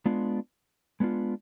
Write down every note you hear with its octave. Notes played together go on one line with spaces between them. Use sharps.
G#3 B3 D4 F4
G#3 B3 D4 F4